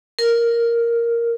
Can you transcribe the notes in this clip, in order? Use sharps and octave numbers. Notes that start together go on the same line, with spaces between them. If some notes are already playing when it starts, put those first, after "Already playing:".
A#4